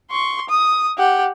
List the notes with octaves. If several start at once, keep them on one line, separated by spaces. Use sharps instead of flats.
C6 C#6
D#6
G4 F#5